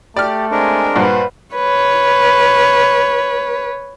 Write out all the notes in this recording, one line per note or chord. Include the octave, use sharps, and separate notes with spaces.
A3 G4 D5 F6
G#3 C4 D4 A#4 G#5
G2 A#2 B4 C5 F#5
B4 C#5